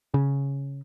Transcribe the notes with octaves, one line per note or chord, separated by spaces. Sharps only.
C#3